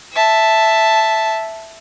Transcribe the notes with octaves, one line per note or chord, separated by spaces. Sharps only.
E5 A5